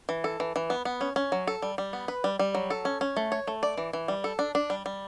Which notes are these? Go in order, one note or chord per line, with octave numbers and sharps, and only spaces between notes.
E3
A4
E3
E3
B3
B3
C#4
C#4
F#3
A4
G3
G3
B3
B4
G3
G3
F#3
A4
C#4
C#4
A3
C#5
A3
D5
E3
E3
G3
A4
D4
D4
G3
G3